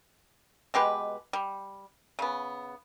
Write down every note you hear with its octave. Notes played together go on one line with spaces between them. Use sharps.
B2 G#3 G4 B4
G3
C#3 B3